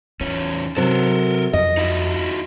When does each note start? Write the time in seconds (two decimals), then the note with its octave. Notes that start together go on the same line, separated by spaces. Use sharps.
0.21 E2 C#4 D#4
0.77 C3 F#3 A4 A#4
1.53 F2 D#5
1.77 D#4 E4 F#4